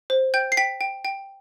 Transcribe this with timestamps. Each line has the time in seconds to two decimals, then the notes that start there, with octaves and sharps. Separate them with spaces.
0.10 C5
0.34 G5 G6
0.52 C7
0.57 G5 B6
0.81 G5
1.05 G5